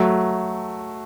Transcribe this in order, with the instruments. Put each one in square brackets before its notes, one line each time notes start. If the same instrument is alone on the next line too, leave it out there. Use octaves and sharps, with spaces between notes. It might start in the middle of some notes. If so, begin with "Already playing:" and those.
Already playing: [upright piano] F#3 A3